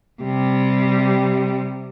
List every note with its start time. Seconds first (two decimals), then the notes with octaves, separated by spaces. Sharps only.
0.22 C3 G3